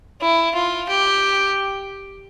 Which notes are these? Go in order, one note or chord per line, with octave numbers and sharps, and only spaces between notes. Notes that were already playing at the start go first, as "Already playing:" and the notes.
E4
F4
G4